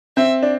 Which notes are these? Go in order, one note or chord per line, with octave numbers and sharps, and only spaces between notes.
C4 E5
D4